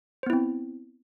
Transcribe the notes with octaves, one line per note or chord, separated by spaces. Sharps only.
B3 C4 E4 C5